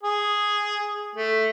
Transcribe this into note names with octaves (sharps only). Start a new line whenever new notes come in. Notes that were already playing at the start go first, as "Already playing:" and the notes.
G#4
A3